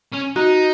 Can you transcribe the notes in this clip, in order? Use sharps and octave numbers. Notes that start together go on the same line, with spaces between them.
C#4
D#4 F#4